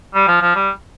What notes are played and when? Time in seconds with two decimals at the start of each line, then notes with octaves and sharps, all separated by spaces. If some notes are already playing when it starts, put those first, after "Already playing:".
0.15 G3
0.28 F3
0.41 F3
0.55 G3